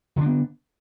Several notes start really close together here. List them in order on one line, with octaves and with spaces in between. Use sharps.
D3 D4 B3